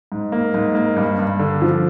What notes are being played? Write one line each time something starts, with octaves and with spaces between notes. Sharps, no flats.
G#2
A#3
G#2
A#3
G2
G2
D3
F3